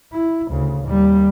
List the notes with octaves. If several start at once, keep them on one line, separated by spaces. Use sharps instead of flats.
E4
D2 C#3
D#2 G3